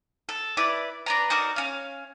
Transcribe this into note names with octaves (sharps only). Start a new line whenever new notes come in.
A4
E4 B4 D5
D4 B4 A#5
D#4 F#4 A#4 D5
C#4 F5